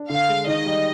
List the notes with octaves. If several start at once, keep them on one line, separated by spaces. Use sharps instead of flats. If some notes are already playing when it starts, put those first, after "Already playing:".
Already playing: D4
D3 F5
G#3
D#3 D#5
G3